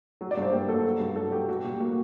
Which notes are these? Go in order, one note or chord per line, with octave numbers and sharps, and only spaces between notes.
F#3
D5
G2 C5
A#3 G4
F#3 A4
F#3
G2
F#3 A4
F#3 G4
G3 F#4
A#2 G4
A#3 F#4